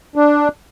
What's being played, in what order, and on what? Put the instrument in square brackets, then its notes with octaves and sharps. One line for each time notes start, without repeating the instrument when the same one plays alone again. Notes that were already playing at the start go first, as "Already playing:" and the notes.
[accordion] D4